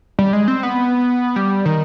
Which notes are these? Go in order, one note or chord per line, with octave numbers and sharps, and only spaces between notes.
G3
G#3
C4
B3
G3
D#3